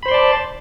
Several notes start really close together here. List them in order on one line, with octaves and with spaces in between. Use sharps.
B5 C5 C6 D5 A5